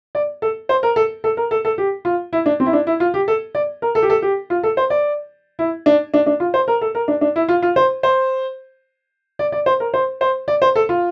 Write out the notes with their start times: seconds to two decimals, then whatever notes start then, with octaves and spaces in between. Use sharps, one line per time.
0.15 D5
0.42 A4
0.69 C5
0.83 A#4
0.96 A4
1.24 A4
1.37 A#4
1.51 A4
1.65 A4
1.78 G4
2.05 F4
2.33 E4
2.46 D4
2.60 C4
2.66 E4
2.73 D4
2.87 E4
3.00 F4
3.14 G4
3.28 A4
3.55 D5
3.82 A#4
3.95 A4
4.02 G4
4.10 A4
4.22 G4
4.50 F4
4.63 A4
4.77 C5
4.90 D5
5.59 E4
5.86 D4
6.14 D4
6.26 D4
6.40 F4
6.54 C5
6.68 A#4
6.81 A4
6.95 A#4
7.08 D4
7.21 D4
7.36 E4
7.49 F4
7.62 F4
7.76 C5
8.03 C5
9.39 D5
9.52 D5
9.66 C5
9.80 A#4
9.94 C5
10.21 C5
10.48 D5
10.62 C5
10.76 A4
10.89 F4